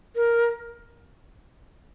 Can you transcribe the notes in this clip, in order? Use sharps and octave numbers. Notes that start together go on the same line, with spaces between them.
A#4